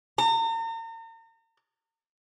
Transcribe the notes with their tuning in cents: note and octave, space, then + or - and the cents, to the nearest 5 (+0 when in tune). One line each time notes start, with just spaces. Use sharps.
A#5 -40